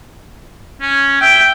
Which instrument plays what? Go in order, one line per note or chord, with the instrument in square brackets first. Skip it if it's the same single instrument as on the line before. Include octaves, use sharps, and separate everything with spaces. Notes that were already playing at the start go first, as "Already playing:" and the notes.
[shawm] C#4
[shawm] E5 [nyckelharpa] G5